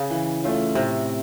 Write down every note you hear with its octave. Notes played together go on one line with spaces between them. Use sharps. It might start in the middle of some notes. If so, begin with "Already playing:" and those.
Already playing: C#3
E3
A3 C#4 F4
A2 C3